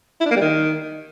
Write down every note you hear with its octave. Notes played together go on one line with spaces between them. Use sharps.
E4
D4
A#3
G3
D#3